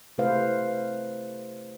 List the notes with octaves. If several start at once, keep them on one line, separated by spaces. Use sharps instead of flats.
C3 A3 E4 B4 C5 F5